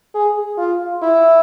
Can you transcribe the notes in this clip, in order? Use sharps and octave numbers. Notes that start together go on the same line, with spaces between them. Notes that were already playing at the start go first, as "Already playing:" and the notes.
G#4
F4
E4